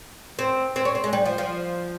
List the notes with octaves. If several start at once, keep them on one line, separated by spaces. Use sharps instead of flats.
C4
C4
C#4
C4
G#3
G3
F3
F3